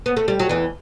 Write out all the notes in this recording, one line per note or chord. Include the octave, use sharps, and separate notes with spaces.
B3
A3
G3
F#3
E2 E3